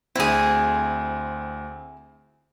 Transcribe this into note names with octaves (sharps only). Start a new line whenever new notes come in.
D2 C4 E4 G#4